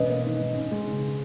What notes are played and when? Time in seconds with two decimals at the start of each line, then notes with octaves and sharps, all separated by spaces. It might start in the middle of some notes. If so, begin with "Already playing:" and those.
Already playing: E1 C#4 B4 D#5
0.09 A#3
0.25 D#3
0.40 G#2
0.55 C#4
0.72 G#3
0.87 C#3